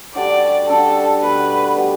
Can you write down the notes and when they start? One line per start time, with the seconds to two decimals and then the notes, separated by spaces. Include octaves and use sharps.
0.15 D3 G3 D4 F#4 D5
0.68 D3 G3 D4 F#4 A4
1.22 B2 G3 B3 F#4 B4
1.75 B2 G3 B3 F#4